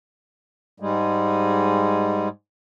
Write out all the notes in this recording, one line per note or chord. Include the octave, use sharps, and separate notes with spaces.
G#2 G3 G#3